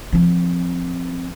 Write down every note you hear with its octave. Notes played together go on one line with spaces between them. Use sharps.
F3 C4